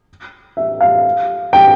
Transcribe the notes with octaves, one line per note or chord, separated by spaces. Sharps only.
E5
F5
G5